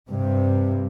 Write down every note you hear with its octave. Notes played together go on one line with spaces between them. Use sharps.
G2 C3